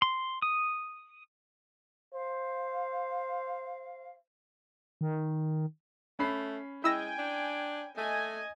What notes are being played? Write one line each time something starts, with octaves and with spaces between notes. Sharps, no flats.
C6
D#6
C5 F5
D#3
A3 C#4 B5 C7
G#3 E4 G5 G#5 E6 A#6
D4
A3 D#5 G#5